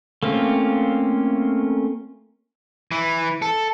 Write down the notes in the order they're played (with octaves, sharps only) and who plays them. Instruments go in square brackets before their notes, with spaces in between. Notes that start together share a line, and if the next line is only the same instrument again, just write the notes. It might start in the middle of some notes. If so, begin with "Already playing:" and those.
[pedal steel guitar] A3 A#3 C4 C#4 F4
[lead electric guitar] E3
A4